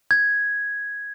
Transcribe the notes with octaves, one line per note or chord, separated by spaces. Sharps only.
G#6